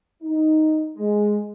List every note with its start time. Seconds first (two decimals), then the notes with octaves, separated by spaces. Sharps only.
0.22 D#4
0.96 G#3